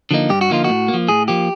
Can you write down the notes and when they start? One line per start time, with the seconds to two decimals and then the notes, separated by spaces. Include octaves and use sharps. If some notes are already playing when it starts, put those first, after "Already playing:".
0.11 D3 F3 A#3 D#4
0.29 G2 G4
0.41 F#4
0.50 D3 F3 A#3 D#4 F4
0.64 A2 F#4
0.88 A#3
0.94 F3
1.08 A2 G#4
1.28 F3 A#3 G4